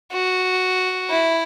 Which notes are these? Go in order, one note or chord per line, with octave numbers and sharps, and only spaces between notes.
F#4
E4